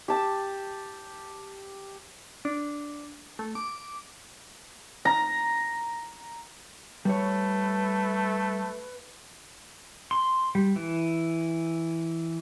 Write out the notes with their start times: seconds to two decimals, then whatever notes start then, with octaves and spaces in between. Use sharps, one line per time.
0.08 G4 A5 E6
2.45 D4
3.39 A3
3.55 D6
5.05 A#5
7.05 G3 A3 B4 C#5
10.11 C6
10.55 G3
10.76 E3